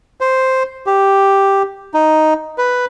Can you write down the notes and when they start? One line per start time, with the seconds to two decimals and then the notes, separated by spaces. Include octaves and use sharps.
0.21 C5
0.86 G4
1.94 D#4
2.58 B4